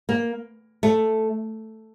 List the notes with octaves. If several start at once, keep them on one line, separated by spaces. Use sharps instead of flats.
A#3
A3